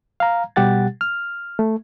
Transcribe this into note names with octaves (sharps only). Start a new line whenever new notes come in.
F5 A#5
B2 G3 G4 F#5 A6
F6
A3